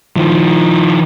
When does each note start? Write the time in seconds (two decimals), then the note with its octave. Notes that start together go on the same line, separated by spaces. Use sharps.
0.16 D#3 F3